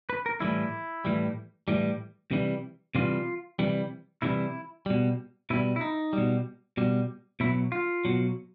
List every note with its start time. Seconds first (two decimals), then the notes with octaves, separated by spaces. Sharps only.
0.10 B4
0.26 A#4
0.40 A2 E3 G3 E4
1.05 A2 E3 G3
1.68 A2 E3 G3
2.31 C3 E3 G3
2.95 C3 E3 G3 F4
3.59 C3 E3 G3
4.22 C3 E3 G3 E4
4.86 B2 G3
5.50 B2 G3 E4
5.76 E4
5.81 D#4
6.13 B2 G3
6.77 B2 G3
7.40 B2 F#3 E4
7.72 F4
8.05 B2 F#3